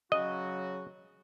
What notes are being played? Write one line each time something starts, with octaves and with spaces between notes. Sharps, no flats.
C#3 F#3 F#4 D#5